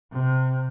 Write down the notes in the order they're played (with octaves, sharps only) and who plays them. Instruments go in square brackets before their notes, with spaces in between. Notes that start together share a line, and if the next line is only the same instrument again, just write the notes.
[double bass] C3